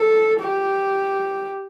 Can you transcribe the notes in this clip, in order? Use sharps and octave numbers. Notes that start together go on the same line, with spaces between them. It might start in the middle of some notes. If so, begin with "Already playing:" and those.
Already playing: A4
G4